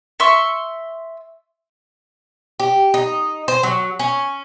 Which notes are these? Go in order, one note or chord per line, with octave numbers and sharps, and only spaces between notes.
E5 C6 C#6 E6
G4
D#4
C5
F#3
C#4